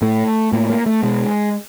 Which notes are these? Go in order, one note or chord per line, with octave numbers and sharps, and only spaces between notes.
A2 A3
A2 A#3
A#3
A3
B2 G#3